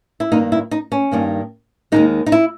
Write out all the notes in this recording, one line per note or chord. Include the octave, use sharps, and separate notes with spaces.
E4
G2 D#3 A#3 D#4
E4
D#4
C#4
G2 D#3 A#3
D#2 D#3 G#3 D#4
D#4
E4